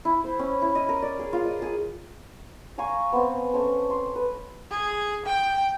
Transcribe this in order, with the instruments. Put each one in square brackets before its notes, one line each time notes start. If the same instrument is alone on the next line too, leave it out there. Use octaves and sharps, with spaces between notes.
[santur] E4
C5
C#4
E4
D#5
A#4
D5
G#4
F4
D#5
G#4
F5 G#5 A#5 C#6
B3 C4
A3 C4 C#4 C#6
C6
B4
[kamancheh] G#4
G5